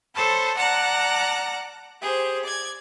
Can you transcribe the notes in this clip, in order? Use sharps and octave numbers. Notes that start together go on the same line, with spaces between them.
A4 C5 C#5 A5 B5
D5 F#5 A5 A#5 F6 F#6
G4 G#4 C5
D5 G#6